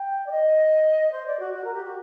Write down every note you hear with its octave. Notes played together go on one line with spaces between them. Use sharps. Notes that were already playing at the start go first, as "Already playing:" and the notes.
Already playing: G5
D5
D#5
C5
D5
F#4
F#4
A#4
G4
F#4